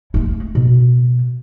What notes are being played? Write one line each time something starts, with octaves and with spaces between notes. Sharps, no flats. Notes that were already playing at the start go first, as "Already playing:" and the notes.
G#3 A3
B2